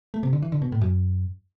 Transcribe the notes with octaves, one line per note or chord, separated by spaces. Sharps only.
A3
C3
D3
E3
D3
B2
A2
F#2